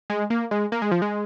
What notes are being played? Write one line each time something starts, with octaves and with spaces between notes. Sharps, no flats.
G#3
A#3
G#3
A#3
G#3
F3
G#3